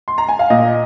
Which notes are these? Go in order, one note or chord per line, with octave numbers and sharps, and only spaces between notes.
C6
A#5
G#5
F5
A#2 D#5